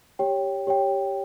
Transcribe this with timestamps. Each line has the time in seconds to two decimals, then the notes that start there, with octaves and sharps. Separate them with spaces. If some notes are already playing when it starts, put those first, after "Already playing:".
0.19 G4 C#5 G5
0.67 G4 C#5 G5